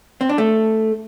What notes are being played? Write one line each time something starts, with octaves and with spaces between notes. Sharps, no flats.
C4
D4
A3